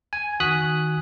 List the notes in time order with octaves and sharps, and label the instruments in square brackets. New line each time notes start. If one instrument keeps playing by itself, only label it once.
[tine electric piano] G#5
D#3 F#4 G#5 D#6 F#6 B6